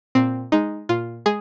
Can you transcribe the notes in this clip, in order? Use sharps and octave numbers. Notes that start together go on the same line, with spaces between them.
A#2 C4
G#3 D#4
A#2 F4
G#3 G#4